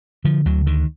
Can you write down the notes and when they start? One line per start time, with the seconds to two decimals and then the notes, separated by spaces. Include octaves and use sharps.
0.24 D3 F3
0.46 D2 F#3
0.66 D3 D#3